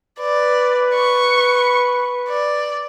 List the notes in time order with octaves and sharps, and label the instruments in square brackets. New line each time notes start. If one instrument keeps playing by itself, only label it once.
[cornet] B4 [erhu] D5
[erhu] C#6
D5